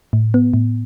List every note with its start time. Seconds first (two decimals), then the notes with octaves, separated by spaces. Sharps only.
0.13 A2
0.34 B3
0.54 A2